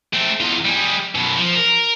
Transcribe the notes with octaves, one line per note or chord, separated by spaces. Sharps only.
A3 C4
E2 F4
G3 G#4
F#2 B2
F3
A#4